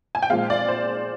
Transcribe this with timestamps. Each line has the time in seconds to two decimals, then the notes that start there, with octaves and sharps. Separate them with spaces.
0.15 G#5
0.22 G5
0.30 A#2 F3 G#3 F5
0.50 D5
0.68 C5